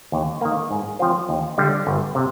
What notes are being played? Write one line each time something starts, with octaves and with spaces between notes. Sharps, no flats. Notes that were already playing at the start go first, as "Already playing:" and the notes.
D#2
D#3 A#3
G#2
F3 C4 F4 C5
D#2
D3 G3
G1
C3